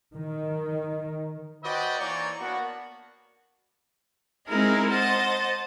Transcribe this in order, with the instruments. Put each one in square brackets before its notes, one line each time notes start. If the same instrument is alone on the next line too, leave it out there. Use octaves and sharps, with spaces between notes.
[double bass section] D#3
[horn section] F#4 B4 C5 D5 D#5 G5
E3 A#3 D#4 C#5 D5
A#3 B3 D4 F#4
[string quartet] G#3 C4 D#4 E4 G#4 A#4
C5 D#5 F#5 A5